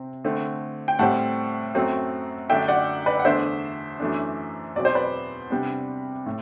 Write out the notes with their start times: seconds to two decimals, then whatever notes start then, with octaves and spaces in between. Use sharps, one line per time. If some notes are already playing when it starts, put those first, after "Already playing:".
Already playing: C3 C4
0.24 D3 A3 C4
0.88 G5
0.99 A2 G3 C4 F#5 A5
1.74 F#2 F#3 A3 C4
2.49 F#2 D3 A3 D4 E5 G5
2.68 D5 F#5
3.06 B4 D5
3.19 F#5
3.25 E2 D3 A3 D4 C5 E5
4.00 F#2 E3 A3 D4
4.76 E2 B2 F#3 C4 D5
4.85 C5
4.95 B4 D5
5.50 C3 G3 B3 D4
6.26 A2